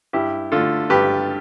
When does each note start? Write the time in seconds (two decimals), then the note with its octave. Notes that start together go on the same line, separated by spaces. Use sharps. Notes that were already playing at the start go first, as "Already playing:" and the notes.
0.13 G2 E4 G4
0.52 D3 A3 F4 A4
0.90 G2 G4 B4